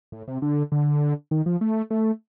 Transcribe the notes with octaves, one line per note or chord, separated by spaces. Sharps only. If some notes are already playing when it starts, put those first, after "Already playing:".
A2
C3
D3
D3
D#3
F3
A3
A3